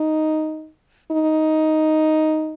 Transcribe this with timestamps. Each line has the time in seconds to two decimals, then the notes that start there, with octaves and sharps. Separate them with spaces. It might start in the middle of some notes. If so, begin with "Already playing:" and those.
Already playing: D#4
1.11 D#4